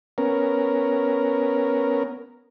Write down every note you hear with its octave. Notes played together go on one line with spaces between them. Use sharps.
B3 C#4 A#4